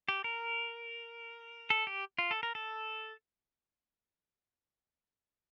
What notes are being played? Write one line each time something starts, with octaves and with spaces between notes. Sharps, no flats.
G4
A#4
A4
G4
F4
A4
A#4
A4